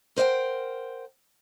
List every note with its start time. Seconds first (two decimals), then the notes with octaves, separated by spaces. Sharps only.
0.16 A#4 C5 D5 F#5 G5